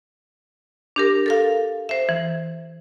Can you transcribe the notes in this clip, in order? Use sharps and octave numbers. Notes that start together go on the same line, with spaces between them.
D4 G4 A#4
A4 A#4 F5
C5 E5
E3